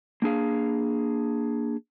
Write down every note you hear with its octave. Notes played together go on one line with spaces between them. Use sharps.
A#3 D4 G#4 F5